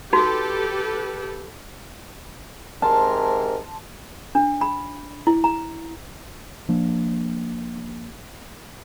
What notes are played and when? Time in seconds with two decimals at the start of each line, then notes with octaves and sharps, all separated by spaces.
0.13 D#4 F#4 G4 A4 B4
2.82 G#2 C3 A#4 A5 C6
4.35 D4
4.61 B5
5.27 E4
5.44 A#5
6.69 F3 A#3 D4